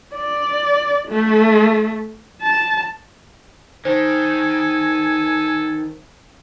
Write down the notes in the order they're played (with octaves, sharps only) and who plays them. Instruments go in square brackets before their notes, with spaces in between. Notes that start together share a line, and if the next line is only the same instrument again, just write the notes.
[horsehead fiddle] D5
A3
A5
[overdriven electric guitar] D#3 [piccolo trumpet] A4 [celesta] C5 [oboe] G#5